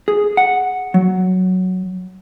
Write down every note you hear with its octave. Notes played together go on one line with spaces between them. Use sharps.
G#4
F#5
F#3